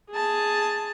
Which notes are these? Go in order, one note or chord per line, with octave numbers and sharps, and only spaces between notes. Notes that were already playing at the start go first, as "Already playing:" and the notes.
G#4 A5